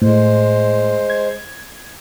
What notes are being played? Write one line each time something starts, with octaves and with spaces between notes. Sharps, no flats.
A2 G#3 C5
G#6